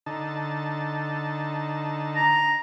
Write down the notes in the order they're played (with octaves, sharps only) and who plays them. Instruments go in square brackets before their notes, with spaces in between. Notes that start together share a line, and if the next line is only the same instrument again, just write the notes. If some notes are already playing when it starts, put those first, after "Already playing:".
[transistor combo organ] D3 D#4 A5
[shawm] A#5